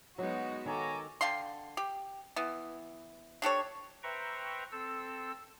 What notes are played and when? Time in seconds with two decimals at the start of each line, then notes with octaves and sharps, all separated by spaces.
0.18 F#3 G#3 B3 D#4 F#4
0.66 D#3 A4 C#5 G#5 A#5 D6
1.21 D3 F5 G5 C6
1.77 G4
2.36 E3 B3
3.42 D4 G4 A4 C#5
4.03 B4 C5 E5 G5 A#5 C#6
4.72 C4 A4 E6